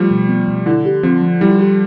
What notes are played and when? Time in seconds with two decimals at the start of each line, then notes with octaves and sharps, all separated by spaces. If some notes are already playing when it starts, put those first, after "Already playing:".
Already playing: F3 G3 A3 F4
0.11 B2
0.29 B3
0.48 B2
0.66 D3 E4
0.85 G4
1.03 F3 C4
1.22 F3
1.41 G3 E4
1.59 G4